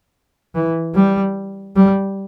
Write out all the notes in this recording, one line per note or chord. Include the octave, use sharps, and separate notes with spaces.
E3
G3
G3